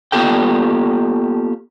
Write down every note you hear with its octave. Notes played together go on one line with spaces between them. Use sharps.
A#3 B3 F4 G4 A4 G5